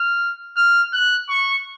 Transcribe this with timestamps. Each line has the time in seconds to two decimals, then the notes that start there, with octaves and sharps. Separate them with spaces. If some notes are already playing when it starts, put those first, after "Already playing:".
Already playing: F6
0.56 F6
0.93 F#6
1.29 C#6